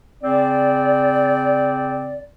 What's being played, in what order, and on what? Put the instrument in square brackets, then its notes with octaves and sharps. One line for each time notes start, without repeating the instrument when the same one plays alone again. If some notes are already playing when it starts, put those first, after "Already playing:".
[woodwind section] C#3 C4 D5